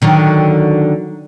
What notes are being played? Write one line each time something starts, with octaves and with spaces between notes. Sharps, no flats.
D3 D#3 F#3